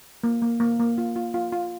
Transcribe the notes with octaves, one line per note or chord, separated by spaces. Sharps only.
A#3
A#3
A#3
A#3
F4
F4
F4
F4